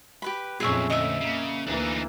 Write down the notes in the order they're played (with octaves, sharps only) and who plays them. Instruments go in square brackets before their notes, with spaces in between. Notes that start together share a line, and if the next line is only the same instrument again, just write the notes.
[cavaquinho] G4 B4 B5
[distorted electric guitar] B1 [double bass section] F2 A#2 C#4 [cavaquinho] G#4 E5 C#6
[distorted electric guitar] D2 [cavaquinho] D#5 E5
[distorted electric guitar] C#3 [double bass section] A#3
[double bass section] D2 E3 A#3 [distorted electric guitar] D4 D#4